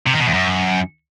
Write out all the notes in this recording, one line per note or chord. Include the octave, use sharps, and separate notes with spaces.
C3
D#3
B2
E2
F#2